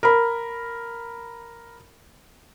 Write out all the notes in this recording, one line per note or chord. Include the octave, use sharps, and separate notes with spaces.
A#4 B5